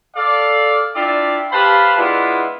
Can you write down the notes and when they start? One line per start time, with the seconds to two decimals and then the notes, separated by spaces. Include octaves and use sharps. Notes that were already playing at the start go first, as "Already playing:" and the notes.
0.16 A4 D5 F5
0.95 D4 E4 F4 D5 E5 G5
1.52 G4 B4 C5 F5 A5 B5
1.97 G#3 B3 D4 E4 F4